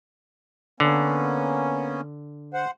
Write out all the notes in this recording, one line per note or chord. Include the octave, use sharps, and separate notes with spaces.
D3 A#3 B3 C#4
C5 F#5